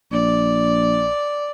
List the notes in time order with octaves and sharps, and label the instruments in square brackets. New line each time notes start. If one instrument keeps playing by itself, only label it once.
[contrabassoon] A#1 [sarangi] D5